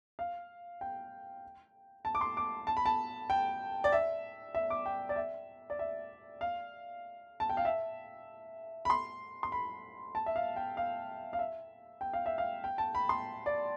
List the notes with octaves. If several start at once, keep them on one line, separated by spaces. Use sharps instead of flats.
F5
G5
A5
D6
C6
D6
A5
B5
A5
G5
D5
E5
E5
D6
G5
D5
E5
D5
E5
F5
A5
G5
F5
E5
B5
C6
C6
B5
A5
E5
F5
G5
F5
F5
E5
G5
F5
E5
F5
G5
A5
B5
C6
D5